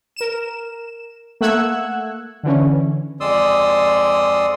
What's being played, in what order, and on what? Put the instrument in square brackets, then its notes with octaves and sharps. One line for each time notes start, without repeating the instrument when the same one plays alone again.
[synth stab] A#4 E7
A3 A#3 F#5 E6 F#6 G#6
D3 E3 C#4
[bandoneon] F2 G#3 D5 C6 D#6 E6